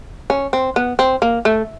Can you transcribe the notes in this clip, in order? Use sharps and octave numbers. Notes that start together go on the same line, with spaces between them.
C#4
C4
B3
C4
A#3
A3